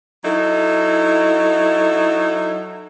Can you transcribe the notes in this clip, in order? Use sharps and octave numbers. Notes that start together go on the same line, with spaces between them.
F#3 D#4 E4 A4